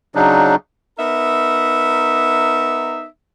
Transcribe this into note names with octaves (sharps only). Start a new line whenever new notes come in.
C#3 F#3 D4 D#4
B3 D#4 A#4 E5